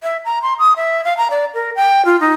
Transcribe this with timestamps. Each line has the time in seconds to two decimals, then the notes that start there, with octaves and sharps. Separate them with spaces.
0.03 E5
0.25 A#5
0.42 C6
0.59 D#6
0.76 E5
1.04 F5
1.17 A#5
1.31 D5
1.54 A#4
1.76 G5
2.05 F4
2.21 D#4